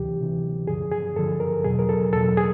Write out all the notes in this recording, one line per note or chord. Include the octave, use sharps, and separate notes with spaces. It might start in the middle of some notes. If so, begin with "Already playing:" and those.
Already playing: D2 C3 E3 G4
D2 C3 E3
G2 D3 F3 G#4
G#4
G2 D3 F3 A4
A#4
E2 B2 F#3 G#4
A#4
A4
E2 B2 F#3 A4
G#4